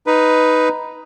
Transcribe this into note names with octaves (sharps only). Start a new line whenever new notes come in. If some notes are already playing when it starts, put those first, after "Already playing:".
D#4 B4